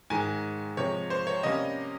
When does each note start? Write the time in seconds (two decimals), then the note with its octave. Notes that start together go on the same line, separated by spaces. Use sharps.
0.10 G#2 D#3 G#3 G#5
0.77 C3 F3 G#3 C#5
1.10 C5
1.27 C#5
1.43 C3 G3 A#3 C#4 D#5